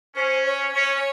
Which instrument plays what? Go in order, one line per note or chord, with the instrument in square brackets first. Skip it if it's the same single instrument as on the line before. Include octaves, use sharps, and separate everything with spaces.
[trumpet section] C#4 [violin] C5
[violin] C#5
[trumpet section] C#4 [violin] C#5